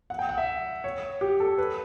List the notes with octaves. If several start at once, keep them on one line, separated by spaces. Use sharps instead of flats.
F#5
G5
F#5
E5
C#5
G4
A4
B4